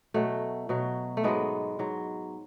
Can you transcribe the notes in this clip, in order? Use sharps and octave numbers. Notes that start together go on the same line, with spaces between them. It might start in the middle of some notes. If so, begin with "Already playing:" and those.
B2 F#3 A3
B2 F#3
A3
G#2 F#3 G#3 B3
G#2 F#3